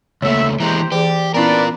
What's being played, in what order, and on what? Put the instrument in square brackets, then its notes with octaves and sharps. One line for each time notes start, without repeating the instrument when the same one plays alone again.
[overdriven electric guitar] C#2 A3 [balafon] A#3 C#5 [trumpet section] E5
[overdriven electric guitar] E3 G#3 [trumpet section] G4 C5 A#5
[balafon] E3 G#4 [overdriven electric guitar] G4 [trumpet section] D5
[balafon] B3 C#4 E4 [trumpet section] D4 B4 D5 [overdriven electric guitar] F4 A#4